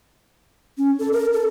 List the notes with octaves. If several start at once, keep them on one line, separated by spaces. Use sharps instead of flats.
C#4
A4
A#4
A4